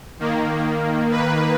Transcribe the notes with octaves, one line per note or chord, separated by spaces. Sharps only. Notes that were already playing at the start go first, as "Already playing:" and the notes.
D#3 A#3
B4